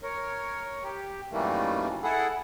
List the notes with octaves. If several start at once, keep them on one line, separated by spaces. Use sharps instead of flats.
A#4 C#5
G4
F#2 D#3 E3 G3 A3 A#3
E4 G#4 A4 F#5